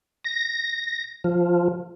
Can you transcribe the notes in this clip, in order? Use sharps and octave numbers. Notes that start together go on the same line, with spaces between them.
A#6
F3